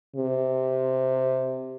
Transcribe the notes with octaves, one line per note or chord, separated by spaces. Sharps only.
C3